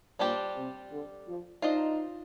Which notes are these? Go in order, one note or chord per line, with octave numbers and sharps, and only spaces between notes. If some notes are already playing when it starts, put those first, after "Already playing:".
A#2 G3 D4 G4 C5
C3
D3
F3
D4 D#4 F4 C5 D#5